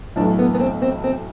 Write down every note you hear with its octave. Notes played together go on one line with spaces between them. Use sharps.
B1 A2 E3 D4
B3
B3
C4
C4
C4